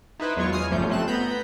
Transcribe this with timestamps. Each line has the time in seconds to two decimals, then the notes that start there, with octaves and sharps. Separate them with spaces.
0.20 D#4 E4 B4 C5
0.36 E2 F#3 G#3 F4 C#5 C#6
0.53 G#5 D#6 F6 C7
0.71 G1 F3 G3 A3 C#4 G6
0.89 F3 A3 C4 F#6 E7
1.08 B3 A#5 B5 G6